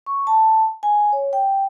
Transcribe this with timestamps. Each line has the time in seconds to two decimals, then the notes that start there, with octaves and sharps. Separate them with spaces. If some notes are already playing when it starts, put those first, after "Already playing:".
0.06 C#6
0.27 A5
0.83 G#5
1.13 C#5
1.33 G5